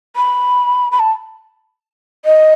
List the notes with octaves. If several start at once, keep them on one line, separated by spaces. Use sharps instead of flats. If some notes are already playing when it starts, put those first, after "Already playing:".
B5
B5
A5
D#5